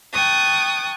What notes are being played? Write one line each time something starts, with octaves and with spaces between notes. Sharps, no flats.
G5 A5 C#6 D#6 F#6